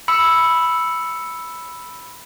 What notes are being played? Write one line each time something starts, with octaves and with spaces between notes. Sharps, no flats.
B5 E6 C#7